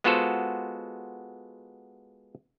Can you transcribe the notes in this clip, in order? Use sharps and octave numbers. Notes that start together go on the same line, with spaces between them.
G#3 B3 F4 F#4 A4 C5